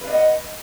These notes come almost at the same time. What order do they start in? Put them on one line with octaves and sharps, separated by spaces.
B4 F5 D5 D#5 F#5